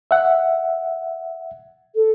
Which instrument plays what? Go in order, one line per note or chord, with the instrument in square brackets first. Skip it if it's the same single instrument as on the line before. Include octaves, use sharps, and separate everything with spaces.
[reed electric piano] E5 F#5
[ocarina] A4